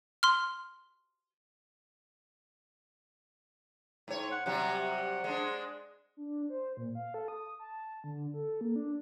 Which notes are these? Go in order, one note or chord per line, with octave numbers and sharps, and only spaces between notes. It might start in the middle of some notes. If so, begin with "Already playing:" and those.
C6 F6
G#2 C#5
F#5
C3 F#3 G3 F#5
G#3 D4
D4
C5
A#2
F5
A4
D#6
A5
D3
A4
A#3
D4